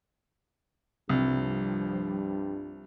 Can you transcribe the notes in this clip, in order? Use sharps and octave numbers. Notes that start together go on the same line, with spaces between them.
C2 G2 F3 G3